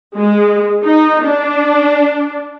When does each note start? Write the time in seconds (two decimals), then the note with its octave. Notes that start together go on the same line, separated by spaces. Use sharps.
0.16 G#3
0.84 D#4
1.25 D4